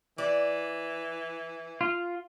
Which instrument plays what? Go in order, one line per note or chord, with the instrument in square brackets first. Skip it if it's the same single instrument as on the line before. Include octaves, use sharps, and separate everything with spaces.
[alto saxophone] E3 [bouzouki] D5
[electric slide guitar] F4